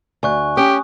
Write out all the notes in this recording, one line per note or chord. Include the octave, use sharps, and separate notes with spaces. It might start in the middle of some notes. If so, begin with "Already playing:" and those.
D2 G#5 C#6 F#6
C#4 G4 D#6